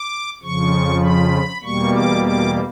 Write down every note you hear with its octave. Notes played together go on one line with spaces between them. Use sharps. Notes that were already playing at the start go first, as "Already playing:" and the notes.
Already playing: D6
F2 C#3 F3 C#6
B5
E2 B2 G3 A#3 C#6
D6
D6